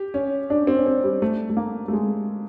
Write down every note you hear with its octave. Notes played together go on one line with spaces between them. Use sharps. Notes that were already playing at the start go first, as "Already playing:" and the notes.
Already playing: G4
C#4
D4
C4
C#4
C4
G3
A3
A3
A#3
A3
G#3